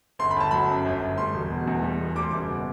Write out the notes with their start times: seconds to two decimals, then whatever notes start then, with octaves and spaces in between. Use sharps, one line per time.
0.19 G1 C6
0.31 B5
0.36 G1 A5
0.51 F#3 B5
0.69 F#2
0.86 G1
1.02 G1
1.18 G3 C6
1.34 E1
1.50 B2
1.67 E2
1.83 G3
2.00 E1
2.16 G3 D6
2.23 C6
2.31 F#1 D6
2.49 B2